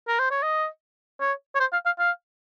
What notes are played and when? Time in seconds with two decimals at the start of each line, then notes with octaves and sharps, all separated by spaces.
0.08 A#4
0.19 C5
0.31 C#5
0.43 D#5
1.20 C#5
1.55 C#5
1.60 C5
1.73 F5
1.86 F5
1.99 F5